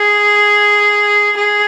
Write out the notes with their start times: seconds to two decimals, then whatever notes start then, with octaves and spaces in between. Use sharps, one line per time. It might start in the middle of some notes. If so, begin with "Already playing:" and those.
Already playing: G#4
1.37 G#4